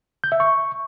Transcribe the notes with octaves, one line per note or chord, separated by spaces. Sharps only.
G6
E5
C#6